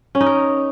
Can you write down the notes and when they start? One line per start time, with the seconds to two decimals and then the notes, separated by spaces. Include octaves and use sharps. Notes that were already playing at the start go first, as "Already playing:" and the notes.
0.15 C#4
0.21 D#4
0.26 A#4